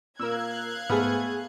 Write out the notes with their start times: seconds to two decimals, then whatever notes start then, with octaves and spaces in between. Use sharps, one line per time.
0.19 A#2 A#4 F5 E6 F#6 G#6
0.90 G#2 A3 B3 G#4 B5 F6